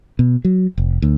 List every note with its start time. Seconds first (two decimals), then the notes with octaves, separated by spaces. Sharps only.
0.19 B2
0.45 F#3
0.78 F1
1.02 D2